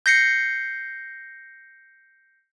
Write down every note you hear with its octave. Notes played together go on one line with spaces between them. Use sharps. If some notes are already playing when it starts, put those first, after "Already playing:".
G6 A#6 C7 C#7